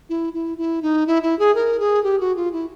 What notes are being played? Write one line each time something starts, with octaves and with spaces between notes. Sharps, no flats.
E4
E4
E4
D#4
E4
E4
G#4
A#4
G#4
G4
F#4
F4
E4